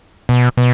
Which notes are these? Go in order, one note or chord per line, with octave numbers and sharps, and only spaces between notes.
B2
B2